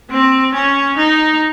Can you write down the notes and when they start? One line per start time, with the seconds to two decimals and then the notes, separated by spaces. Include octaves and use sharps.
0.10 C4
0.54 C#4
0.97 D#4